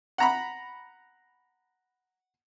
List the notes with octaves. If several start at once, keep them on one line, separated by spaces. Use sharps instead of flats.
F#5 A#5 B5